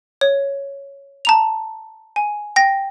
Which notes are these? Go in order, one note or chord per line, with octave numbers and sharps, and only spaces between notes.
C#5
A5 A#5 F7
G#5
G5 A#6